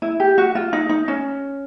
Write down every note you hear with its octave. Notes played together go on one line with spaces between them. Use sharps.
E4
G4
F#4
F4
D#4
D#4
C#4